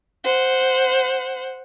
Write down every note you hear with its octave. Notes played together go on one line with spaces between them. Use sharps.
C5 F#5